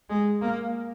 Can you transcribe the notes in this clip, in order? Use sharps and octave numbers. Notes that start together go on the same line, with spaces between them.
G#3
A#3